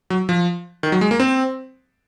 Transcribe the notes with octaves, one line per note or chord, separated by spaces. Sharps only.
F#3
F3
D#3
F#3
G#3
A#3
C4